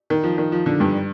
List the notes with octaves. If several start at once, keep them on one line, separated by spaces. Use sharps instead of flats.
D#3
F3
D#3
F3
D3
G2